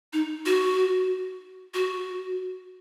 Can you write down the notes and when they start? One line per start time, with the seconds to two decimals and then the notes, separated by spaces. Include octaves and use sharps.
0.13 D#4
0.46 F#4
1.74 F#4